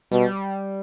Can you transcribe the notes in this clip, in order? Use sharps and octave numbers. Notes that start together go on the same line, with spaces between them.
B2 G3